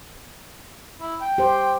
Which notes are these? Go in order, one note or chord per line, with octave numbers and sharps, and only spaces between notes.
E4
G5
G4 C5